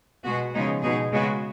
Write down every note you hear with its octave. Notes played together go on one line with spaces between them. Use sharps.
B2 G#3 B3 F#4
C#3 F3 G#3 B3 D#4
B2 G#3 D#4 G#4
C#3 G#3 B3 F#4